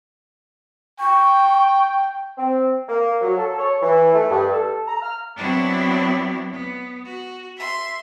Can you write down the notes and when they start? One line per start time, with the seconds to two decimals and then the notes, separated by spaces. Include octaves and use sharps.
1.00 G5 C#6
2.38 C4
2.88 A#3
3.21 F#3
3.38 A4
3.58 C#5
3.82 E3
4.13 A3
4.30 G2
4.52 A4
4.87 A#5
5.01 F6
5.36 F#3 B3 C4 D4 E4 F#4
6.51 B3
7.05 F#4
7.57 E5 C6